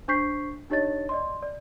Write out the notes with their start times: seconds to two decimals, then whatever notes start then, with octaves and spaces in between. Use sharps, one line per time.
0.08 D4 C5 C#6 G6 B6 C7
0.70 D4 D#4 G4 C#5 D#5 A6
1.09 D5 D#5 C6
1.43 D5